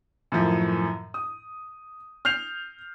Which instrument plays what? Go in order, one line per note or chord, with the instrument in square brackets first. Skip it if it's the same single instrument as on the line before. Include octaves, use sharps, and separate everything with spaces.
[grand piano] F#2 A2 D#3 F3
D#6
F6 G6 C7 F7